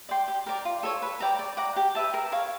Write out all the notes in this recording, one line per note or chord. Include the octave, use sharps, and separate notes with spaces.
D5 G5 C6
G4
A#4 D5
F4
A4 C#5
B4
D5 G5 A#5
D5
F#5 A#5 D6
G4
B4 E5 A5
A#4
C#5 F5